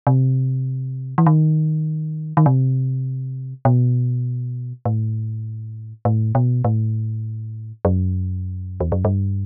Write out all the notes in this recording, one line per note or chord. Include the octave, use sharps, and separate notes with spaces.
C3
E3
D#3
D#3
C3
B2
A2
A2
B2
A2
F#2
E2
F#2
G2